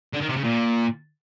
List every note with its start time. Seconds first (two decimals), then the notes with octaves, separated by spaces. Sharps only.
0.14 D3
0.22 D#3
0.29 C3
0.37 C#3
0.45 A#2